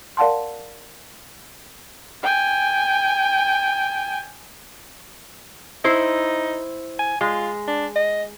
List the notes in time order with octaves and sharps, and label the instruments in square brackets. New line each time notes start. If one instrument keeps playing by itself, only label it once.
[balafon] A#4 D5 F5 F#5 A5 C6
[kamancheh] G5 G#5
[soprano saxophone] D#4 [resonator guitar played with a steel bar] E4 C5
[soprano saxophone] G#5
[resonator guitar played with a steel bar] G#3 [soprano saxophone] F4
[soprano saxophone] D4
D#5